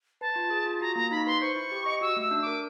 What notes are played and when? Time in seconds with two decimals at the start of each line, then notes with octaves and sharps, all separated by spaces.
0.21 B4 A5
0.36 F4
0.50 G#4
0.66 F4
0.81 F#4 A#5
0.96 A#3 A#5
1.11 D#4 B5
1.27 B4 C6
1.42 C5 C#6
1.56 E4
1.72 G4
1.86 D#5
2.01 F#4 E6
2.16 A3
2.22 E6
2.31 D4
2.42 A#4 D6